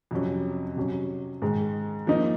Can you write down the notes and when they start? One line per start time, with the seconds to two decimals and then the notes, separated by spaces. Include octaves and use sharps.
0.11 F2 C3 F#3 C#4
0.76 C3 F#3 C#4
1.42 G#2 D#3 G#3
2.07 F3 A#3 D#4